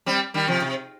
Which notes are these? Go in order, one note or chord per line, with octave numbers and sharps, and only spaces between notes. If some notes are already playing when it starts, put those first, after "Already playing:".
G3 C4
D#3 G3
C3 F3
C3